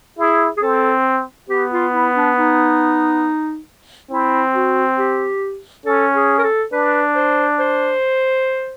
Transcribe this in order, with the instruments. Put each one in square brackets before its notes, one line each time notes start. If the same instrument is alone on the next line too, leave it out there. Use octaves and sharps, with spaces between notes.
[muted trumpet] E4 [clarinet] G#4
[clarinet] G#4
[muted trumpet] C4 [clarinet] A4
[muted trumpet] B3 [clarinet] G4
[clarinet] F4
E4
D4
D#4
[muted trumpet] C4 [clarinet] E4
[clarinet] F#4
G4
[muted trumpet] C#4 [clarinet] A4
[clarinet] G#4
A#4
A4
[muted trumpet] D4 [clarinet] B4
[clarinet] C5
C5